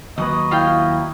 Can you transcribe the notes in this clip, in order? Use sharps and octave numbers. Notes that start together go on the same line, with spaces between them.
D#2 F#3 B4 D#5 D#6
E4 F4 F5 G5